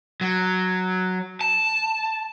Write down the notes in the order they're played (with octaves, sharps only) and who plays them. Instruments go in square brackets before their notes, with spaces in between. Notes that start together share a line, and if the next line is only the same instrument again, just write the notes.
[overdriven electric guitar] F#3
A5